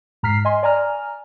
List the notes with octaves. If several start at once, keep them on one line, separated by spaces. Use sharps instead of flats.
G#2 A#5 F6 B6 C7
D#5 G#5 C6
D5 G#5 A#5 F6